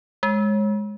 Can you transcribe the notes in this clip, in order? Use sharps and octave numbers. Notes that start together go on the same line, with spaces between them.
G#3